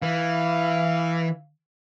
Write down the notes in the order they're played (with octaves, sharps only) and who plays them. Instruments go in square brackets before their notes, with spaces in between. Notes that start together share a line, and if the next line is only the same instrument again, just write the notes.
[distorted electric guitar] E3 [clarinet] F5